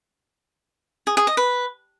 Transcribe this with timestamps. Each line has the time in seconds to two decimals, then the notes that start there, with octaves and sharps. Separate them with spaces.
1.07 G#4
1.17 G#4
1.27 D#5
1.37 B4